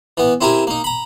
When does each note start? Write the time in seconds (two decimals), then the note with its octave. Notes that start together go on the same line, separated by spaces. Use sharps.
0.17 E3 B3
0.41 C4 E4 G4 A#4 G#5
0.67 A#3 D#4
0.84 A#5 B5